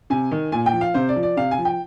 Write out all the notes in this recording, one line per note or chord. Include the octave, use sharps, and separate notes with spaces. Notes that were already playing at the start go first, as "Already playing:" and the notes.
C3 G#5
D#3
A#2 G#5
G5
F3
F5
C3 C5
D5
F3
D5
C3 F5
G#5
F3
G5